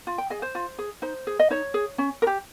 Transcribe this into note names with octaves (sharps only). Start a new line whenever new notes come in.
F4
G5
G#4 D#5
C5
F4
G#4
D#4 C5
G#4
D#5
D#4 C#5
G#4
C#4
A#4
G4